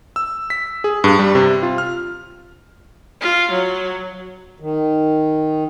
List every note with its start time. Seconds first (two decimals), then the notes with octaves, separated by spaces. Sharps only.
0.16 E6
0.50 B6
0.84 G#4
1.04 G2
1.19 G3
1.35 C3
1.63 F4
1.78 F6
3.21 F4
3.51 F#3
4.60 D#3